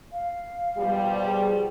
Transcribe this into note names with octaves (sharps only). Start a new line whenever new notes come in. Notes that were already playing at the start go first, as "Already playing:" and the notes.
F5
B2 F3 G3
G#4